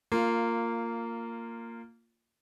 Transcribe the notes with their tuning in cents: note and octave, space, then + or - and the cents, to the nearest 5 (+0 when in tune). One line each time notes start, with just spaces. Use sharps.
A#3 -15 F4 +0